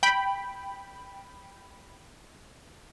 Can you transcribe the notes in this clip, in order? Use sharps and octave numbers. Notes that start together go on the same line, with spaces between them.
G5 B5